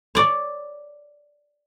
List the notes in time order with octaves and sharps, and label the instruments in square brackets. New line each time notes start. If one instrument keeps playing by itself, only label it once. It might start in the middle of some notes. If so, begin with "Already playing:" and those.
[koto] C#5 D5